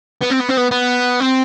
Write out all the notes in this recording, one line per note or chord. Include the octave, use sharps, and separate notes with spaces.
B3
C4
B3
C4
B3
B3
C4